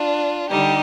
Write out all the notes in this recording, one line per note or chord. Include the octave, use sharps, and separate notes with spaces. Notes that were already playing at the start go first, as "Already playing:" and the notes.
Already playing: D4 F4
D3 G3 D#4 G4